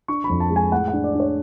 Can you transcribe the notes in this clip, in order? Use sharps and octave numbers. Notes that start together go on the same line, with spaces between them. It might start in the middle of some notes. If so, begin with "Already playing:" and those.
D4 C#6
B5
F2
A5
G#3
G#5
A2 F#5
F#5
D4
D5
D4
C#5